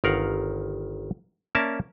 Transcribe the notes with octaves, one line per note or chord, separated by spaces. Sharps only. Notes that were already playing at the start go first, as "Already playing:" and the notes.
G1 D#3 A#4 F5 F#5
A#3 C#4 A#4 D5 E5 A5